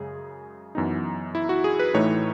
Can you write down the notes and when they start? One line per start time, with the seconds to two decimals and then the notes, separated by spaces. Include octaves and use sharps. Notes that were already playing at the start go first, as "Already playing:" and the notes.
Already playing: F#2 C#3 G#3 G#4
0.75 F#2 E3 B3 D#4
1.35 E4
1.49 F#4
1.64 G#4
1.79 B4
1.94 A2 E3 A3 D#4 C#5